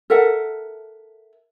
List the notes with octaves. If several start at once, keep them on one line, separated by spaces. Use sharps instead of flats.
A4 A#4 E5 F#5